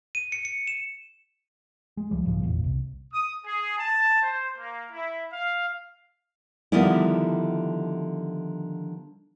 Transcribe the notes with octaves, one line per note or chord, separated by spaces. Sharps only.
D#7
C#7
C#7
E7
G#3
C#2 F3 G3
C2 G#2 C#3 F3
G#1 E2 A#2
C2
D#6
G#4
A5
C5
A#3
E4
F5
D3 D#3 F3 G3 B3 E4